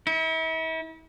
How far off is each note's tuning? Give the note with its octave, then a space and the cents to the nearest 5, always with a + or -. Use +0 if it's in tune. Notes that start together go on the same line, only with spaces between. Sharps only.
E4 -40